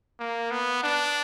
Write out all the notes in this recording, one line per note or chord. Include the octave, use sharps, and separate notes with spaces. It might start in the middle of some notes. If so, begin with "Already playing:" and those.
A#3
B3
D4